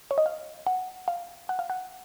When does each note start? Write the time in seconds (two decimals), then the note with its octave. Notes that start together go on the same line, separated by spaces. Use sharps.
0.11 C#5
0.18 D#5
0.26 F5
0.67 F#5
1.08 F5
1.49 F#5
1.59 F5
1.70 F#5